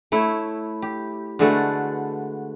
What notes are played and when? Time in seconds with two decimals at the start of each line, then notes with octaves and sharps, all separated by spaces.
0.12 A3 E4 C#5
0.82 G4
1.39 D3 G#3 A3 F#4 A4 B4